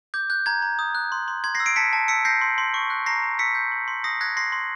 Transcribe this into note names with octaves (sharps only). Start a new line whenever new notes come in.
D6 G6
F#6 G6
A#5 G#6
A#5
D#6
F#6
C6
C6
C6 G#6
A#6 C7
E6
C7 D7
A5 B6 C#7
A5
E6 B6 C#7
G6 A#6 C7
C6
C6
C#6
F#6
A#5 A#6 C7
A#5
E6 B6 C#7
G6
C6
C6
D#6 A#6 C7
F#6 G#6 A#6
C6 A#6 C7
C6